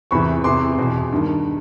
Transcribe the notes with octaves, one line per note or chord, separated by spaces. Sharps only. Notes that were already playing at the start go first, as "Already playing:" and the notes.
E2 C3 E3 B5 C#6
E2 C3 E3 C6 D6
E2 B2
G2 D#3